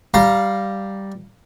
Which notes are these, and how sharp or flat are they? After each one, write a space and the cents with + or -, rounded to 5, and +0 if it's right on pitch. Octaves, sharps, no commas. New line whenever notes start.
G3 +0 F5 +0 A#5 +0